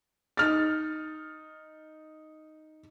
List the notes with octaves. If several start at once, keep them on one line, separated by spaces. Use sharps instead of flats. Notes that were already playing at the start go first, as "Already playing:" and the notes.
D#4 F6 A6